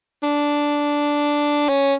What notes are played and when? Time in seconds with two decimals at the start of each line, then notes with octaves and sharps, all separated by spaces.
0.23 D4
1.69 C#4